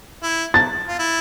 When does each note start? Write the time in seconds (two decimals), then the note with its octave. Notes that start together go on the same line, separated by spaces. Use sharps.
0.23 E4
0.54 A6
0.88 F4
0.99 E4